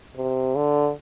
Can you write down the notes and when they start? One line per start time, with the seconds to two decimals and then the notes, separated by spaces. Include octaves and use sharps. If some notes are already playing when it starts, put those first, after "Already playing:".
0.16 C3
0.55 D3